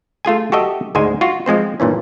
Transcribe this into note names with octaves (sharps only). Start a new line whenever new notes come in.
A3 F4 G#4 G#5
F#4 G4 A4 D#5 E5
D2 G#2 G#3 C5 G#5
F4 F#4
F3 G#3 C4 C5
G2 A#2 E3 C#4